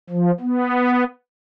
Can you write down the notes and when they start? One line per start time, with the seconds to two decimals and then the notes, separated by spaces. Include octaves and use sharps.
0.10 F3
0.40 B3